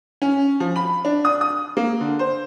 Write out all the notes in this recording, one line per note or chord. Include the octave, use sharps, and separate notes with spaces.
C#4
F3
B5
D4
D#6
D#6
A#3
D3
C5